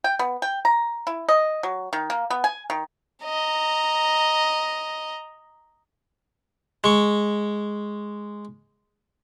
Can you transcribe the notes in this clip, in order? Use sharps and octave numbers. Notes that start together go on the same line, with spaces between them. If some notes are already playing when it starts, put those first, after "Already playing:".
G5
B3
G5
A#5
E4
D#5
F#3
D#3
A#3
B3
G#5
D#3
D#5 A#5
G#3 C#6